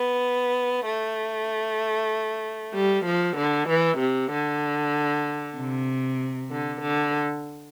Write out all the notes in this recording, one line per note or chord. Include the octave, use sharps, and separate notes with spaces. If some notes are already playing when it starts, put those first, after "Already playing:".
Already playing: B3
A3
G3
F3
D3
E3
C3
D3
C3
D3
D3